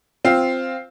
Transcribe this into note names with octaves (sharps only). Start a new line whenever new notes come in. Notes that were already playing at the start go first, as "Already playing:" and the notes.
C4 F4 F5